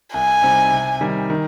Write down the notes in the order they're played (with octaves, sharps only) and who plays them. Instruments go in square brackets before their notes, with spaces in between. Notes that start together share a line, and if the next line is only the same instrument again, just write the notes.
[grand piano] C2 [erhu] G#5
[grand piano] C3 G3 C4 D#4
C3
D#3 G3
D#3